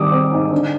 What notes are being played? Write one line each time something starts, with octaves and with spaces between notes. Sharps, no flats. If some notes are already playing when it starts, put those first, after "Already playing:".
Already playing: G#1 G#2 G3 D6 D#6
C4
G#2
D3